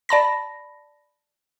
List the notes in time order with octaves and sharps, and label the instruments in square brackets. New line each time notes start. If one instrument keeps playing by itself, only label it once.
[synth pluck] D5 A5 B5 A#6